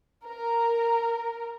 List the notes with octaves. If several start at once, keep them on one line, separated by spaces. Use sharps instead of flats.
A#4